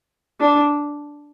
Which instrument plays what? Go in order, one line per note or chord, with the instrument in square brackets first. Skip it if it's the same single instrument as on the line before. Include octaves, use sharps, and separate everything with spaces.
[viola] D4